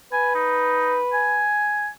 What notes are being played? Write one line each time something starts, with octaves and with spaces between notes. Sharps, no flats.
B4 G#5
D#4
G#5